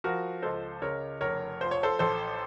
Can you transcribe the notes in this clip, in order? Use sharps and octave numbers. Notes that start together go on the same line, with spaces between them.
F3 F#4 A#4
C#2 A4 C5
C#3 A#4 C#5
F1 A#4 C#5
F3 C5
C#5
A4 C5
A1 A4 C5